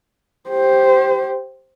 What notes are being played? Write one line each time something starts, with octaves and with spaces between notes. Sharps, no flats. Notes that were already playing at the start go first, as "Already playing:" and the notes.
G4 C5